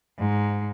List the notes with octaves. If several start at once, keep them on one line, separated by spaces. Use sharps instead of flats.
G#2